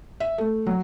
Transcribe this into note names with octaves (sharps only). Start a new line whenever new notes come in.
E5
A3
F#3